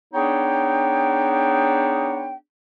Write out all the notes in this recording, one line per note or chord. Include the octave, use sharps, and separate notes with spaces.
B3 D4 D#4 G#4 C#5 G5